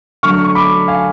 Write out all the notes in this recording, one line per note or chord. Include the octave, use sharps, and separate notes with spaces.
D3 F#3 A3 C#6 F6
C#6
B5 D6
F5 G#5